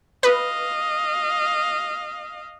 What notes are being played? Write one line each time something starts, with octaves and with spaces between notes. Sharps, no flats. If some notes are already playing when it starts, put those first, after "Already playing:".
B4 D#5 F5